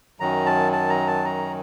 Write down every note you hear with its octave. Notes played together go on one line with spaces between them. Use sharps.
F#2 D#3 F#3 A#5
A5
A5
A#5
A5
A#5